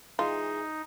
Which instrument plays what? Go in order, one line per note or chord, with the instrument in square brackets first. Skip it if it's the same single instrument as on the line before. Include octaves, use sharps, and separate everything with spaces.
[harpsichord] E3 G#3 [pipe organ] D#4 [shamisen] F4